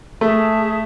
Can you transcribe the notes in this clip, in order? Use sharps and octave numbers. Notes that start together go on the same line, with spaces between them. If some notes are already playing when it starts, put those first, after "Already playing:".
A3 G#4 E5 A5